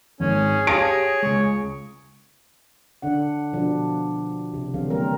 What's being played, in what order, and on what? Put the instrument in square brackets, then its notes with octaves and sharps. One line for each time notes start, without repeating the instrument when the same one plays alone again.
[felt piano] G#1 G#2 [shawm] C#4 [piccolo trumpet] G#4
[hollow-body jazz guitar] G4 F5 A5 [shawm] C#5 [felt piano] D#6 A#6 D7
[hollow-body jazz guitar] C#2 G#3 [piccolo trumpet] C#6
[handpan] D3 D4 F#5
B2 F3 D4
C3
D3 E3 F#3 C4 F5
G3 A#3 C4 A#4